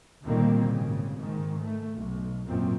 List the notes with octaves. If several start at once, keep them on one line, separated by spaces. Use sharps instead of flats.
D2 A#2 D#3 G3 A#3 C4
G#1 C#3
G#2 D#3
A3
B1
G#1 F#2 A#2 C4